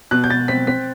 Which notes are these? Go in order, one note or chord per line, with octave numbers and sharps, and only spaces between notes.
B2 F#6
G6
B2 A6
C4 B6
C4 B6